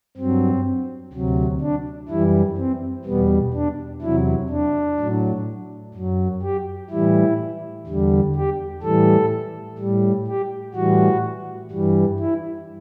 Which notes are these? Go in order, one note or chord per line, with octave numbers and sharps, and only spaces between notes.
G2 F#3 C4
D2 C3 F#3
D4
F#2 E3 G3 E4
C4
E2 B2 G3 B3
D4
E2 C3 F#3 E4
D4
A2 F#3
F#2 F#3
G4
A2 E3 G3 E4
E2 D3 G3
G4
A2 E3 G3 A4
A2 G3
G4
A2 E3 G3 F#4
G2 E3 G3
E4